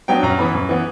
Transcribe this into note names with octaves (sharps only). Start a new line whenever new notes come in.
F#3 B3 D4 G5
F#2 A#5
E3 B3 B5
F#2
E3 B3